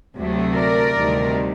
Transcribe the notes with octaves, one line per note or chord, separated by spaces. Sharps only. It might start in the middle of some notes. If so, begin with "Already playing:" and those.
D2 C3 F#3 A3
A#4 D5
D2 C3 D#3 G3